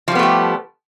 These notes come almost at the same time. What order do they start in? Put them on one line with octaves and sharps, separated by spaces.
F3 G3 B3 A3 G4